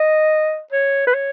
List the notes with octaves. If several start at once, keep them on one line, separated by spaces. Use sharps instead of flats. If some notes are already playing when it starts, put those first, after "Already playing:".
Already playing: D#5
C#5
B4
C#5